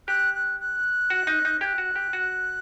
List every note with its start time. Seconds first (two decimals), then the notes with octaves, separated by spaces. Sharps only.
0.08 G4 F#6
0.34 F#6
0.60 F#6
1.10 F#4
1.27 D#4
1.45 D#4
1.61 G4 F#6 G#6
1.78 F#4
1.96 G4
2.13 F#4